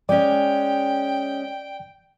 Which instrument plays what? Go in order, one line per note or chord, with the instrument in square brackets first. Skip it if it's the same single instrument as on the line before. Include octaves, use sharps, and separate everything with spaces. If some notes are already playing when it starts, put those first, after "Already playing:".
[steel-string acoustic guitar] G#3 C#4 [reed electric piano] D5 [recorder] G5